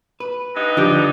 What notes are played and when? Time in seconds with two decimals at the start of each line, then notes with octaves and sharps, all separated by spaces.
0.20 B4
0.55 G2 B3 D#4
0.77 D3 F3 D4 G4